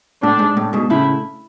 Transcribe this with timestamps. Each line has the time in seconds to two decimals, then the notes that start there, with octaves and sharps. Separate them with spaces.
0.23 A2 D4
0.39 G#2
0.57 A2
0.73 G#2 B2
0.90 A2 C#3 E4